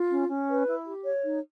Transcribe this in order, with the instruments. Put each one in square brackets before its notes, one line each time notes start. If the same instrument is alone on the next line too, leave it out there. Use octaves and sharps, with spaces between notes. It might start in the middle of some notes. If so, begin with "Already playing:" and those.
Already playing: [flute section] F4
C#4
C#4
B4
E4
G4
C#5
D#4